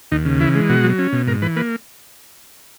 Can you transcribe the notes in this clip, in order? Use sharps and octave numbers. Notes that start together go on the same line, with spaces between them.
D#2 D#4
C#3
E3 E4
G#3
B2 F#4
F#3
C#4
B2
G#2 A#4
E3 B4
A#3 B4